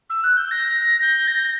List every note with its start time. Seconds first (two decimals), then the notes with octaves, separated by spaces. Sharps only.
0.09 E6
0.23 F#6
0.36 G6
0.51 A#6
1.01 G6
1.27 A#6